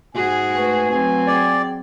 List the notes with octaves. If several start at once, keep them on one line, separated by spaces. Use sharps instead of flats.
G#2 F#4 G#4 G#5
A3 B4 G#5 C#6
F#3 C4 G#5
G#4 D5 G5